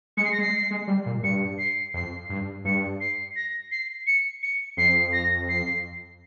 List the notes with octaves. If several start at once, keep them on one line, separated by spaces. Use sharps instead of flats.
G#3 C#7
C7
A#6
G#3
C7
G#3
G3
A#2
G2 C#7
C7
F2 C7
G2
G2 C#7
C7
A#6
C7
C#7
C#7
F2 C7
A#6
C7